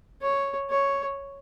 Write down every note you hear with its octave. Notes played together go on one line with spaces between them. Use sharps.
C#5
C#5